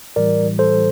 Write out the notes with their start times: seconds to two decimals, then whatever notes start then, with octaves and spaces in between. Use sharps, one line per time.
0.16 A2 E3 G3 A#4 D5
0.59 A4 C5